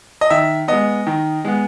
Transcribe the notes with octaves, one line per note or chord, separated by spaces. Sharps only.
D#5
D#3 E5
G#3 B3 D#5
D#3
G#3 B3